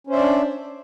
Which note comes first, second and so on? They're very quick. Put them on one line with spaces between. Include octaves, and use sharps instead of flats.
C#4 C5 E5 D5 D4